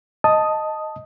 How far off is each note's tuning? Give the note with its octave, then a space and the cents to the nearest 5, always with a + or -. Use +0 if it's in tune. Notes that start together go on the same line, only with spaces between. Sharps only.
D#5 +0 A5 +0 D#6 +0